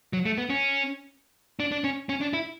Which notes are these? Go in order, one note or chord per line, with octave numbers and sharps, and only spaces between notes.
F#3
A3
B3
C#4
D4
D4
C#4
C#4
D4
E4